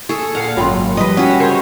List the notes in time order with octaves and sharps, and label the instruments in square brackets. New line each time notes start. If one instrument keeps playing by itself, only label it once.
[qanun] G#4 A4 [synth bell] C#6
[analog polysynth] A#2 F5 [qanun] F#5
[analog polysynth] G#1 F#2 A#2 [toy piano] F4 B5 C6 [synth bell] C#5 G5
[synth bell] F3 G3 G4 [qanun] B4 D#5
[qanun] C#4 F#4 [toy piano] F#5 G5 [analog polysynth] E6
[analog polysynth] C#3 C5 C#5 [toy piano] A#4